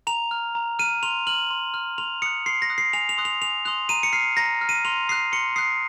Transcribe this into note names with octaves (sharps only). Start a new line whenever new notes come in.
A#5 F7
F6
A#5
F6 D#7
C6 F7
F6 F#7
C6
F6
C6 F7
D#6 F#6 C#7
C6 C7
A#6
D#6 F#6
C7
G#5 F7
F7
C6 D#6 F#6
F7
G#5 F7
C6 D#6 F#6 F7
A#5 D#7
C#7
F6 C7
A#5 A#6
F6
D#7
C6 F7
D#6 F#6 C7
C6 C#7
D#6 F#6 C7